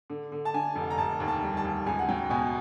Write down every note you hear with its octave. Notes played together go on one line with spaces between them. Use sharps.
D3
D3
A5
D3 G#5
F1
A#5
F1 A5
D#2
A5
G3
A5
D#2
C#2 G#5
F#5
F#3 G5
B2 G#5